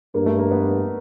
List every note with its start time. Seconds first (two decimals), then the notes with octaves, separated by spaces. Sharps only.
0.15 G2 A#3
0.26 A3
0.38 A#3
0.51 B3